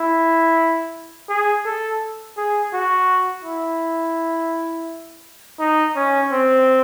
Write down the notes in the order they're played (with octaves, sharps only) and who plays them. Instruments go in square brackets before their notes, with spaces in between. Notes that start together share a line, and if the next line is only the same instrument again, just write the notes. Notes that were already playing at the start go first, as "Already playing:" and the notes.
Already playing: [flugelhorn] E4
G#4
A4
G#4
F#4
E4
D#4
C#4
C4